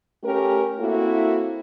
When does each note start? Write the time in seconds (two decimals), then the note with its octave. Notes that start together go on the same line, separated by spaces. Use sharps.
0.24 A3 C#4 G4 A#4
0.80 A#3 C4 E4 F#4 A4